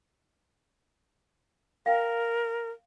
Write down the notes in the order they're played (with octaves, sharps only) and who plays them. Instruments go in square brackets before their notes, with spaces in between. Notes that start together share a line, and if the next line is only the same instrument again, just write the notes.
[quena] A#4 [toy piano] F5 G5